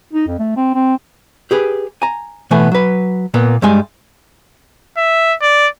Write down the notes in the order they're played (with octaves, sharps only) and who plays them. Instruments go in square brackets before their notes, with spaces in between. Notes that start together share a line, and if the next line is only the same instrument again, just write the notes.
[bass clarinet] D#4
F2
A3
C4
C4
[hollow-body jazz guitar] G4 G#4 B4
G#5 A#5
B2 E3 A3 B3 G#5
F#3 B4
A#2 A#3 B3
G2 G3 G#3 G#5
[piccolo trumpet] E5
D5